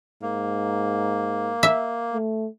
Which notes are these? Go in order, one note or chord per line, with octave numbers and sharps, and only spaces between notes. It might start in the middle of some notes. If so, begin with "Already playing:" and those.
G#2 A#3
E5
A3